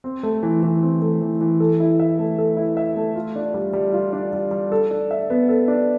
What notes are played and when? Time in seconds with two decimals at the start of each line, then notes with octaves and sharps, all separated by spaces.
0.04 C4
0.23 A3
0.43 E3
0.63 E3
0.83 C4
1.02 A3
1.21 E3
1.41 E3
1.60 A4
1.80 E4
2.00 E5
2.19 A3
2.38 A4
2.57 E4
2.77 E5
2.96 A3
3.15 F4
3.36 D4
3.54 G3
3.73 G3
3.93 F4
4.13 D4
4.33 G3
4.51 G3
4.72 A4
4.91 D4
5.11 E5
5.30 B3
5.49 A4
5.68 D4